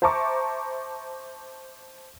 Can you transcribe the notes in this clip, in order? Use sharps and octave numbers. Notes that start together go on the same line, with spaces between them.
C5 E5 A5 A#5 C#6 D6